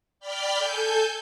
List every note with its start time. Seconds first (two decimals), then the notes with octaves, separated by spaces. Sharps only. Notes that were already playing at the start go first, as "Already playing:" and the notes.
0.19 D5 G5 B5 F6 G6
0.57 A4 G#5 G6